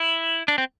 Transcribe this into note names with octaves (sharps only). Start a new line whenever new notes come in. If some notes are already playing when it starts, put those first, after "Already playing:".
Already playing: E4
D4
C4